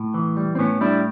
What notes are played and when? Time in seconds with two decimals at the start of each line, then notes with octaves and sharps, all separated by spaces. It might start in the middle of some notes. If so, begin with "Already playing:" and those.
Already playing: A2
0.14 E3
0.37 G3
0.55 C4
0.59 A2 B3 C#4
0.81 G3 D4 E4